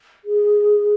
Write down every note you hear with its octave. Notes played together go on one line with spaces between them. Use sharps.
G#4